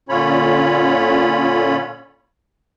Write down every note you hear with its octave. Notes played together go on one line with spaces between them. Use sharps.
A#2 D3 C#4 F4 C#5 B5